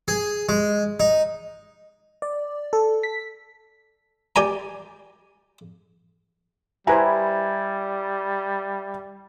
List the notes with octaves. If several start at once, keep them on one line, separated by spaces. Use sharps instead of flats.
G#4
G#3
D#4
D5
A4
B6
G4 D5 G#5 A#5
G3 E4 G4 B4 C5 G#5 A#5